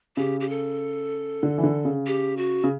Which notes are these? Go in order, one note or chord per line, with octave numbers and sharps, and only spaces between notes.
C#3 G4
G4
A4
D3
E3
D3
C#3
G4
F#4
C#3